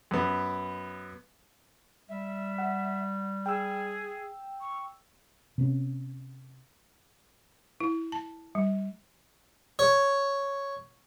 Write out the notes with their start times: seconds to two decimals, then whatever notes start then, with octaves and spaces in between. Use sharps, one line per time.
0.11 F#2 B3
2.09 G3 E5
2.58 F#5
3.46 G#4 G5 E6
4.61 C#6
5.58 C3 B3 C#4
7.80 E4
8.12 A5
8.55 G3
9.79 C#5